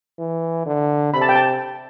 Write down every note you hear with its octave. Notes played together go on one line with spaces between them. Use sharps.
E3
D3
C3 B5
A5
G5
A5